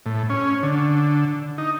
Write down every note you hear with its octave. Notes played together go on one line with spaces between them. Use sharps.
A2
C#4
D3
D#4